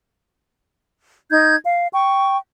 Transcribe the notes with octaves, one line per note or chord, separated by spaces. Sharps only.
D#4 G6 G#6
F5
G5 C#6